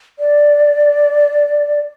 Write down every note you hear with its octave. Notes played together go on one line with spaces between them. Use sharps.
D5